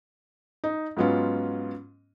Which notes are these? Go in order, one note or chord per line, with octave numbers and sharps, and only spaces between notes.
D#4
G#2 F#3 B3 C#4 F4